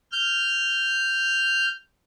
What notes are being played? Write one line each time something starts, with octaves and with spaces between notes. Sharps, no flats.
F6 G6